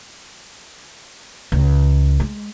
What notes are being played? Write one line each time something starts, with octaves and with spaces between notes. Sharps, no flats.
C#2
G#3